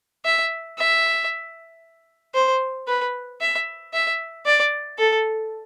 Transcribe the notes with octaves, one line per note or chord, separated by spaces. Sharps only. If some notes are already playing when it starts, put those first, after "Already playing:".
E5
E5
C5
B4
E5
E5
D5
A4